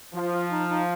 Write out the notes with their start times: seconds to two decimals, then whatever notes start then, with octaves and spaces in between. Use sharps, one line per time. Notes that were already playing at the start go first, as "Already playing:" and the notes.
0.14 F3 F4
0.33 F4
0.51 D#4
0.70 D#4